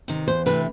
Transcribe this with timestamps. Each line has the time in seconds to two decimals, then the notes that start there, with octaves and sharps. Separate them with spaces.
0.08 C3 D#3
0.28 E2 C5
0.46 C3 E3 A3 D4 B4